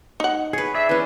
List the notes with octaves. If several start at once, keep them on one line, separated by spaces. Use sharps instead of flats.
D#4 F#5
G#4 B4 C#5
G#4 D5 E5
E3 C#4 B4